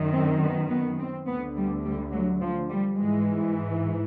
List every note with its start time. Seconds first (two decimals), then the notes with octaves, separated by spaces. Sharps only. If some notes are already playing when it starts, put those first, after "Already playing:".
Already playing: F#2 D#3
0.13 C4
0.42 B3
0.70 B3
0.99 C4
1.27 D2 D3 B3
1.56 G3
1.84 G3
2.13 F#3
2.41 F3
2.70 G3
2.98 G#2 E3 G#3